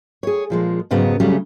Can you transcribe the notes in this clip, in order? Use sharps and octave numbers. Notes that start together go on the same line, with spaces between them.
G#4 C#5
A#2 F3 G#3
F2 G#2 C#3 F#3 B3
C#3 F#3 G3 A3 C#4